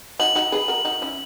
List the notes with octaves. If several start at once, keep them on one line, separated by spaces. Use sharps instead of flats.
D#4 F#4 F#7
D#4 F#4
G#4 B4
F#4 A#4
D#4 F#4
C#4 E4